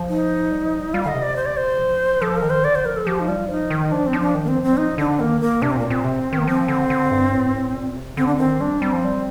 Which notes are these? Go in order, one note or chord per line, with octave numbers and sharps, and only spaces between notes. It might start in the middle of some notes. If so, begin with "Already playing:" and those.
Already playing: F3
D#4
G3
F3
G3
G3 F4
F5
D3 D#5
C3
D5
C5
D5
C5
F3
F3 A4
A#4
D#3
C5
D3 D5
C5
F3 A#4
A4
F3 G4
D#4
G3 F4
F3 D#4
D#3
F3 D4
C4
F3 D#4
D4
D#3
A#3
C4
F3
C4
G3
F3 D#4
D3 D4
D#3 A#3
A#3
C3 D4
C4
A#2 A#3
A#2 C4
C3
D#3
A#3
F3 C4
D3
D3
G2
A2
G2
A2
A#2
C3
D3 C4
D4
D#3 C4
G3 D4
G3 C4
F3
G3